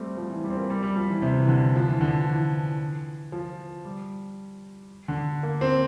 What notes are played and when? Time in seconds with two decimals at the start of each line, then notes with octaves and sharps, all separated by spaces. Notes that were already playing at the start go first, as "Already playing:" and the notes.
Already playing: G3 A3 C4
0.17 F3
0.30 E3
0.44 G3
0.50 C4
0.57 A#3
0.70 G3
0.83 G3
0.96 F3
1.10 E3
1.22 C3
1.38 E3
1.48 D3
1.76 F3
1.89 E3
2.01 D3
2.27 E3
3.32 F3
3.85 G3
5.08 D3
5.43 A#3
5.61 C4